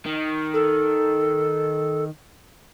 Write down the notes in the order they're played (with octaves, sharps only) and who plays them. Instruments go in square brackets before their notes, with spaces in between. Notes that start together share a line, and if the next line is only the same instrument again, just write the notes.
[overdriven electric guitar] D#3
[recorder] A4